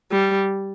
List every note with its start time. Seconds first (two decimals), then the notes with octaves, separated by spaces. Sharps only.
0.12 G3